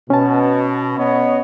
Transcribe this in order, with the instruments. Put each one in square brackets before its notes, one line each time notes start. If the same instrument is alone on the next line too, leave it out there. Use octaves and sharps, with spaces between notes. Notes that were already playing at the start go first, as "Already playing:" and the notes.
[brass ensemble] B2 [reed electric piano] C#4 A5
[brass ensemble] B3 C#5 D#5